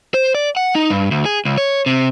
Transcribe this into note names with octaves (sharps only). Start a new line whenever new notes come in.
C5
D5
F#5
D#4
G2
D2
G#4
C#2
C#5
C3